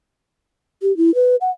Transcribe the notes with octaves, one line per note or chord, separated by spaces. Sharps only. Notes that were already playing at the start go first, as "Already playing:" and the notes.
G4
E4
B4
F#5